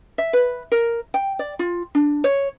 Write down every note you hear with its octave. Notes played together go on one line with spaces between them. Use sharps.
E5
B4
A#4
G5
D5
F4
D4
C#5